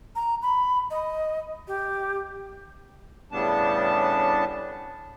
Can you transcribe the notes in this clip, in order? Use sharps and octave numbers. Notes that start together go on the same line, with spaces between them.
A#5
B5
D#5
G4
A2 C#3 G3 B3 D4 A5